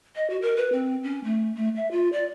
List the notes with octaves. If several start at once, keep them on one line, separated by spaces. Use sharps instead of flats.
D#5
F#4
A#4
B4
C4
C#4
A3
A3
E5
F4
D5